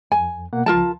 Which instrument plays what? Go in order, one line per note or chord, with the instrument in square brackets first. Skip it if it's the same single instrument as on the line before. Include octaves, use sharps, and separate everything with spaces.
[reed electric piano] F2 [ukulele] G#5
[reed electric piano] B2 A#3 F#5
[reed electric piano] C#2 F3 [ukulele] F4 A#4 A5